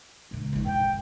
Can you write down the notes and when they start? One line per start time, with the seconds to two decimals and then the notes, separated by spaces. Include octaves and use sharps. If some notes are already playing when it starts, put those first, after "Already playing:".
0.31 C#2 A#2
0.53 G#1 E3
0.66 F#2 G5